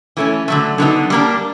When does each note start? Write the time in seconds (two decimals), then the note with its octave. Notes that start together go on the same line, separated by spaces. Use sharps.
0.17 E3 A3 C#4
0.48 D3 F#3 A3
0.78 D3 F#3 B3 D#4
1.10 G3 A#3 D4